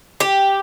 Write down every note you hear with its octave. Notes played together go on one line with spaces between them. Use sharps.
G4